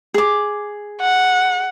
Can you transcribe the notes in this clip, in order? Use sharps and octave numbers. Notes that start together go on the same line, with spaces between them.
G#4 D6
F#5